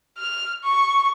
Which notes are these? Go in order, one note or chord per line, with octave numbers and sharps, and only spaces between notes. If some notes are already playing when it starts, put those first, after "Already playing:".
F6
C#6